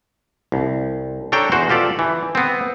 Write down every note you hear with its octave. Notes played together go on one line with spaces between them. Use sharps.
C2
D4 A4 C#5 G5 A#5
E2 F#4 C5
F4 G4 A4 D5
E3
B3 C4